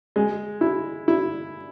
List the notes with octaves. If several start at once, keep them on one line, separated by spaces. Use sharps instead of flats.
G#3
E4
E4